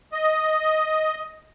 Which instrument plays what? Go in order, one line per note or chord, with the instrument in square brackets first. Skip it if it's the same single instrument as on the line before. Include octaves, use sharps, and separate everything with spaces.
[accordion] D#5